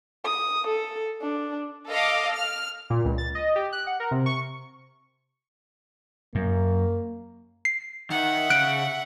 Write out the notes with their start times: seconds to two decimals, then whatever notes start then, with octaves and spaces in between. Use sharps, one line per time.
0.25 D#6
0.67 A4
1.22 D4
1.89 A4 D#5 F5 D6
2.32 F6
2.90 A#2
3.05 C#2
3.18 A6
3.35 D#5
3.56 G4
3.72 F#6
3.87 F#5
4.00 A#4
4.11 C3
4.26 C#6
6.35 F#2 A#3
7.65 C7
8.10 D#3 E5 F#5
8.50 C#3 F#6 D7